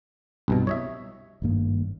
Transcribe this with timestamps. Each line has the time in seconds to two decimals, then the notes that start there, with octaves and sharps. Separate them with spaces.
0.48 C2 G2 B2
0.67 C#5 D#5 E5
1.42 G#1 G2 A#3